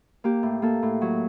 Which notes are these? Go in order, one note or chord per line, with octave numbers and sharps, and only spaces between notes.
A#3 G4
A2
A#3 A4
A2
F#3